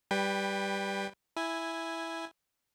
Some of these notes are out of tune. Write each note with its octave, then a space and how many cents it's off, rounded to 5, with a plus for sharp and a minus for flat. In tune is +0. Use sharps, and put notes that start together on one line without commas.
G3 +0 B4 +0 G5 +25
E4 +0 G#5 -5